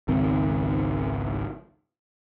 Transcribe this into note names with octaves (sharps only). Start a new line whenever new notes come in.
G#1 C#2 D#3 C4